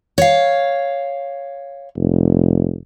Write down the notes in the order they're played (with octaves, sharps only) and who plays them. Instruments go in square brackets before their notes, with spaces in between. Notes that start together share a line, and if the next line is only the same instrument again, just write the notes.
[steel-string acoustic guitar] C#5 F5
[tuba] F1